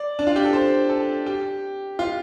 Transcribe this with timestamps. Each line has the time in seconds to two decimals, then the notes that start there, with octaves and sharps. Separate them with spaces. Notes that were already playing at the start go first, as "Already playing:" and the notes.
Already playing: D5
0.19 D4
0.27 F4
0.36 G4
0.45 A4
0.53 C5
0.89 A4
1.26 G4
1.99 F4